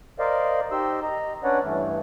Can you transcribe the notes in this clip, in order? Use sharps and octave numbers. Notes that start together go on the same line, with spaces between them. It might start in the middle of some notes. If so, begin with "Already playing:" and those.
A#4 C5 D5 D#5 F5
D#4 G4 C5 D#5 C6 E6
D#5 A#5
C#4 D4 B4 C#5 D5 F#5
G2 E3 A3